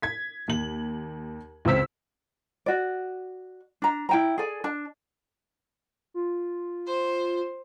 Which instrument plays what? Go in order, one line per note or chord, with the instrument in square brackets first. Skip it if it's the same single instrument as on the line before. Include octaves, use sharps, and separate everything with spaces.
[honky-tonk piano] G#6 B6
D#2 F#7
C#2 C#3 C4 E6 B6
[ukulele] F#4 D5
D4 A#5
E4 G5 A#5
G#4 A4 D5 G#5
D4 A5
[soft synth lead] F4
[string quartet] C5